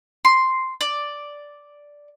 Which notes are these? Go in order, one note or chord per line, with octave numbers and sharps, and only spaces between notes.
C6
D5